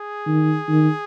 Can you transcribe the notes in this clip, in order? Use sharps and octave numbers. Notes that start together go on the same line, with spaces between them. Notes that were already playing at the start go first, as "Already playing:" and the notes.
Already playing: G#4
D#3
D#3